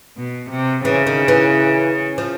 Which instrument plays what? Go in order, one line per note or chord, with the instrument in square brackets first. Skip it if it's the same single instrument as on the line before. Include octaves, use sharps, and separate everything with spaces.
[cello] B2
C3
[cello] C#3 [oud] E3
[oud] D#3
E3
F3